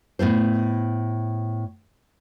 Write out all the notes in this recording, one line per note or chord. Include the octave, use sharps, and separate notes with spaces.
A2 B3 E4 C5